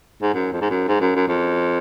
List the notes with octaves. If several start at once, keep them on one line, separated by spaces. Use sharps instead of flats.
G#2
F#2
F2
G#2
F#2
G#2
F#2
F#2
F2